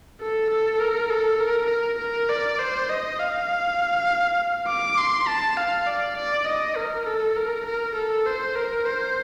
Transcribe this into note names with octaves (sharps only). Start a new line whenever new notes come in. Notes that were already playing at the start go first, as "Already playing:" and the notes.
A4
A4
A#4
A4
A#4
A#4
A#4
D5
C5
D#5
F5
D6
C6
A5
F5
D5
D5
D#5
A#4
A4
A#4
A#4
A4
C5
A#4
C5